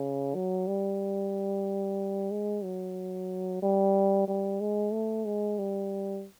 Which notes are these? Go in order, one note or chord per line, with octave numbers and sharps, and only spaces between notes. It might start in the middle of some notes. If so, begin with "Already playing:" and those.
Already playing: C#3
F#3
G3
G#3
F#3
G3
G3
G#3
A3
G#3
G3